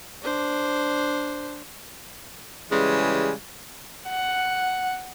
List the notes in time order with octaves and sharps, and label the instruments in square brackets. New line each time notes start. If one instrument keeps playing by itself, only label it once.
[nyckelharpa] D4 C5
[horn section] C#3 E3 G3 G#3
[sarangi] F#5